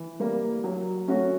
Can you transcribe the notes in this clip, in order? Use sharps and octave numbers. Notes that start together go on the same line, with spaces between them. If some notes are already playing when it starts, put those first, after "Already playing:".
Already playing: E3
G3 A#3
F#3
A3 C#4 F#4